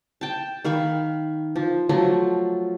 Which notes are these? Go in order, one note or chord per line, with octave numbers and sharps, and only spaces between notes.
G5 A5
D#3 F5 B5 C#6
F3
F3 F#3 A3